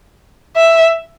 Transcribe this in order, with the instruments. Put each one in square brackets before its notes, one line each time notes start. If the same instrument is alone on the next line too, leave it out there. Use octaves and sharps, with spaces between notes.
[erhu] E5